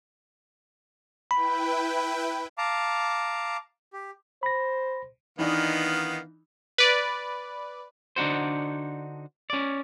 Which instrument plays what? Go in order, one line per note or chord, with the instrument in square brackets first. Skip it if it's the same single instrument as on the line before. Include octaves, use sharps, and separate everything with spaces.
[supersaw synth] E4 B4 G5 [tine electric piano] B5
[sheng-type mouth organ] F5 A5 A#5 D6
G4
[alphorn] C5 [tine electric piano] B5 A#6
[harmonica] D#3 B3 F5 [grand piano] E3 D4 D#4
[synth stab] B4 D5
[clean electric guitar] D3 D4 D#4 F#4 C5
C#4 D5